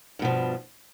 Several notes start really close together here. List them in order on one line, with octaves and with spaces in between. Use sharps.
G2 B2 F3